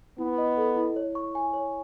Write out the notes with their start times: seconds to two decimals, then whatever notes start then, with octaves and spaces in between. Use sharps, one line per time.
0.18 B3 E4
0.38 D#5
0.57 A4
0.76 E4
0.96 C#5
1.15 C#6
1.35 G#5
1.54 C#5